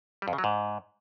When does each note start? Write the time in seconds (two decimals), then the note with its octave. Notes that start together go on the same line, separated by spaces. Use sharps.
0.22 G3
0.28 F2
0.33 C#3
0.38 F#3
0.44 G#2